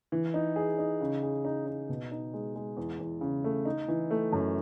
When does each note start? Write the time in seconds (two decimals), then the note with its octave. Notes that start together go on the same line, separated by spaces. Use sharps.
0.12 E3
0.34 D#4
0.56 G#4
0.78 D#4
1.01 C#3
1.23 G#4
1.45 D#4
1.67 D#4
1.89 B2
2.11 D#4
2.34 G#3
2.56 G#3
2.77 E2
2.99 E2
3.21 C#3
3.44 A3
3.65 D#4
3.88 E3
4.11 A3
4.32 F#2